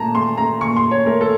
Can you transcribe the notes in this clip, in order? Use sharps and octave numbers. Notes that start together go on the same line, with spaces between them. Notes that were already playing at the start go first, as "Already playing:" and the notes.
Already playing: A#2 A3 A5 A#5
A3 C6
A3 A#5
A#2 C#6
C6
A#2
C#5
A3 A#4
A4